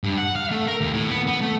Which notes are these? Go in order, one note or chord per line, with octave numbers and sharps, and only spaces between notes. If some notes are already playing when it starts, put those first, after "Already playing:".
G2
F#5
F5
A3
A#4
D#2
A2
B3
B3
A3